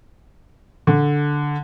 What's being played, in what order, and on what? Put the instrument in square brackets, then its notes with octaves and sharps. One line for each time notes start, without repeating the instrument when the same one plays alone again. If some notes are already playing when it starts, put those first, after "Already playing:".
[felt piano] D3